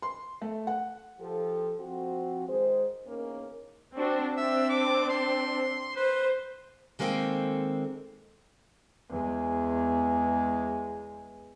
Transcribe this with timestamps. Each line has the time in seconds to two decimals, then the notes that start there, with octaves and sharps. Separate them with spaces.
0.02 C6
0.41 A3
0.67 F#5
1.19 F3 G4 A4
1.79 F3 C4 F#4
2.48 D#3 G#3 G#4 C5
3.06 E2 A#3 C#4 D#4 A#4
3.96 C4 D4 F#4
4.37 C4 D4 E5
4.70 D6
5.09 C6
5.96 B4 C5
6.99 D#3 G#3 A#3 C4 A4 G5
9.09 E2 G#3